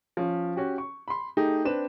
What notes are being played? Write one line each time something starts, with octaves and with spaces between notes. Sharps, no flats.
F3 C#4
C#4 F#4 G4
C#6
B5 C6
A3 D#4 G4 G#4
C4 D4 B4 E7